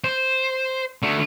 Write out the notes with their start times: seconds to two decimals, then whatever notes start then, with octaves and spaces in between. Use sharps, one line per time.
0.04 C5
1.03 D3 A3